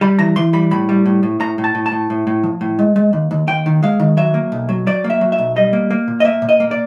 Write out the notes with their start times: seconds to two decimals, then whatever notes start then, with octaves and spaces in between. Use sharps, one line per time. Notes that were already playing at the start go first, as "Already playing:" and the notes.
0.01 G3 B5
0.19 E3 A#5
0.36 E3 C6
0.53 G3 B5
0.71 A2 B5
0.89 G3
1.06 A2
1.23 A2
1.40 A2 A#5
1.58 A2
1.64 A5
1.75 A2
1.86 A5
1.92 A2
2.10 A2
2.27 A2
2.43 F3
2.61 A2
2.79 G#3
2.96 G#3
3.13 D#2
3.31 D#2
3.47 D#2 G5
3.66 D#3
3.83 G#3 F5
4.00 D#3
4.17 F#3 E5
4.34 A#3
4.52 B1
4.69 F#3
4.87 F#3 D5
5.04 A#3
5.10 E5
5.21 F#3
5.32 E5
5.38 B1
5.56 G3 D#5
5.73 A#3
5.91 A#3
6.08 A#2
6.20 D#5
6.25 A#3 E5
6.42 A#2
6.49 D#5
6.60 A#3
6.71 D5